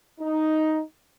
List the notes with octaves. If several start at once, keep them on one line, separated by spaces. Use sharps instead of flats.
D#4